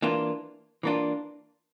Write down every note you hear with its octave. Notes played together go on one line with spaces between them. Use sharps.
E3 A#3 D4 F4
E3 A#3 D4 F4